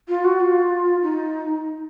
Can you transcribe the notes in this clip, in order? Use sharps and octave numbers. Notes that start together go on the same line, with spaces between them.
F4
F#4
F4
D#4